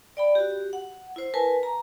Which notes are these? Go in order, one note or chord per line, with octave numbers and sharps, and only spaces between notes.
D5 G5 B5
F#4 G4
F#5
E4 C5
A#4 B4 G#5 A5
A#5